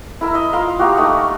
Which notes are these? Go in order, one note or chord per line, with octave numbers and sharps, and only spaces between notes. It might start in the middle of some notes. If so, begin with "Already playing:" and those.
E4 A#4 E5
D#5 E5
F4 A#4 F5
F#4 G4 F5 A#5
A3 D#4